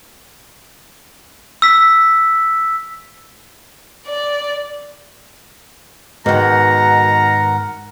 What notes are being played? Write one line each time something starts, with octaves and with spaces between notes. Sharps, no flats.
E6 B6
D5
G#2 B2 D#3 A#4 F#5 A#5